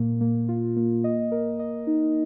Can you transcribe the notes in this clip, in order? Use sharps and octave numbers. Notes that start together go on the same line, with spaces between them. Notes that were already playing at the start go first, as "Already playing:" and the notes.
Already playing: A#2 A#3
A#3
F4
A#3
D#5
A#4
D#5
D#4